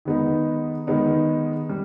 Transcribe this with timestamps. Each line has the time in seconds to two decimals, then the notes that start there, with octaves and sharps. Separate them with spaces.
0.05 D#3 G#3 B3 D#4
0.87 D#3 G#3 B3 D#4
1.69 G3